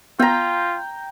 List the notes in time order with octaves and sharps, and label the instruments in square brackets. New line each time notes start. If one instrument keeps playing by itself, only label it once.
[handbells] B3 [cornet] F4 [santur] G5 A#5